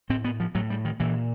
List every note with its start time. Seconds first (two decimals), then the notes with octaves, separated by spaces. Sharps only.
0.09 A2 C4
0.24 B3
0.40 F3
0.55 A2 F#3
0.70 G3
0.85 D#3
1.00 A#2 E3